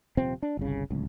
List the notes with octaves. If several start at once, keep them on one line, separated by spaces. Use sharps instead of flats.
D#1 C3 F3 C4
D4
G1 C2 C#3
D1 C#2